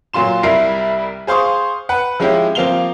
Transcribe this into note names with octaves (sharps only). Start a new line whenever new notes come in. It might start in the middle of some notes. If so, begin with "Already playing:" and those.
A#2 F#3 F4 C6 E7
C2 G3 E4 A#4 C7
G#4 C5 F5 C6 C#6 D#6
B4 F#5
F3 G#3 C#4 E4 G4
F3 A#3 C4 F5 F7 G7